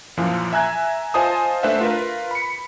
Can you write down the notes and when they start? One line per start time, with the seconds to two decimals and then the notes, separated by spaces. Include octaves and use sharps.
0.17 F#2 A#2 E3 F3
0.53 E5 G#5 A#5 F#6 G#6
1.14 F4 C5 D#5 G#5 A5 D#6
1.63 A3 D4 B4 C5 E5 F#5
1.81 F4 A#4 B4
2.31 B5 C#7